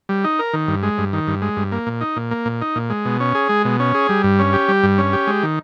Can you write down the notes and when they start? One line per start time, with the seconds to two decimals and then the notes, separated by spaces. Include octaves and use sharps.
0.09 G3
0.24 D#4
0.39 A#4
0.54 D#3
0.68 G2
0.83 G#3
0.98 G2
1.13 D#3
1.27 G2
1.42 G#3
1.57 G2
1.72 A#3
1.86 A#2
2.01 D#4
2.16 A#2
2.31 A#3
2.45 A#2
2.61 D#4
2.76 A#2
2.90 G#3
3.05 B2
3.20 C#4
3.35 G#4
3.49 G#3
3.65 B2
3.80 C#4
3.94 G#4
4.09 G3
4.24 G2
4.39 C#4
4.53 G4
4.68 G3
4.83 G2
4.98 C#4
5.13 G4
5.27 G#3
5.43 D#3